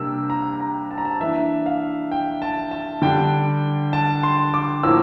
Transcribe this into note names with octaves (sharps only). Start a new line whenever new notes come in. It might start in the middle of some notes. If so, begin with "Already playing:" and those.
Already playing: C3 G3 A#3 D4 E6
A#5
A#5
A5
A#5
A5
E3 A#3 D4 E5
F5
G5
A5
A5
D3 G3 D4 G5
A5
C6
D6
A2 F3 A#3 E6